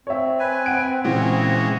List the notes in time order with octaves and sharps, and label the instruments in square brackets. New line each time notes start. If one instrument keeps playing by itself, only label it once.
[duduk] C4 [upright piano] C#5 E5
[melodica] B4 G#5
[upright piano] F#5 D7
[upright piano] A#2 [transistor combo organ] C#3 E3 G#3 [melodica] F#4